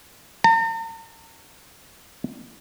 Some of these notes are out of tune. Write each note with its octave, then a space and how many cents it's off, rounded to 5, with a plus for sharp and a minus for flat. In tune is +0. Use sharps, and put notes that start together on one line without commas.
A#5 -45